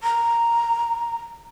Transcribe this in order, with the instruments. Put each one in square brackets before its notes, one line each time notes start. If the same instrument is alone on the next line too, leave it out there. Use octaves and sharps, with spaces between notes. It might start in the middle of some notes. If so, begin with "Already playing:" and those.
[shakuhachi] A#5